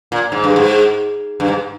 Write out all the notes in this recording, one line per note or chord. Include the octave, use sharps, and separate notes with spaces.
A#2
G#2
G2
G#2
G2
G#2